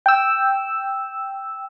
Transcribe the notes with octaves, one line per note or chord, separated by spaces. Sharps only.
G5 E6